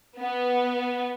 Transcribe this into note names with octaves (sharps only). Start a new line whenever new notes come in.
B3